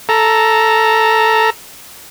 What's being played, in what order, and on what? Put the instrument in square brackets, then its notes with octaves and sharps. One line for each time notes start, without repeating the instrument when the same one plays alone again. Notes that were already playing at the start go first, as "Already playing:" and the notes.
[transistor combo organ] A4 A#5